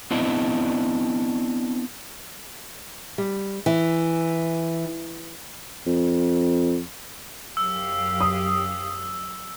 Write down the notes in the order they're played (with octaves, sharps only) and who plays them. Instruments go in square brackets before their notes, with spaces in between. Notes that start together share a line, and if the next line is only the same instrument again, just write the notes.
[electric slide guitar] B3 C4 D4 E4 D5 D#5
[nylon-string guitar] G3
E3
[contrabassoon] F2
[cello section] F#2 G4 F5 [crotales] E6
[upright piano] D#6